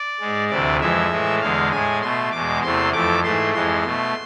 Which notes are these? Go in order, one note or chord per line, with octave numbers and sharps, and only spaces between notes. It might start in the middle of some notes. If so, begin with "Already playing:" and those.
Already playing: D5
G#2 G#3
D2 C3 E3 D5
F2 E3 G#3 E5
A2 E3 G#3
E2 D3 G#3 F5
A2 G#3 G#5
B2 A3 C6
E2 B2 G#3 D6
E2 C3 E3 A3 C6
F2 E3 A3 D6
G#2 E3 A3 C6
F2 E3 G#3 C6
B2 A3